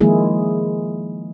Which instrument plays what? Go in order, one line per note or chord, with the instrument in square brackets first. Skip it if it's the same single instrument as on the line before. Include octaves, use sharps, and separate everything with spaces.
[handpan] D#3 F3 G#3 A#3 E4 G#4